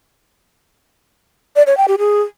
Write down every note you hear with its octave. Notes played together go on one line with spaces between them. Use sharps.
D5
C#5
G5
G4
G#4